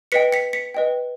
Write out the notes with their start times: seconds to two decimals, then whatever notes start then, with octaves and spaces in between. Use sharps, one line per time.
0.12 B4 D#5 G5 B6 C#7
0.32 B6 C#7
0.53 B6 C#7
0.74 B4 D#5 G5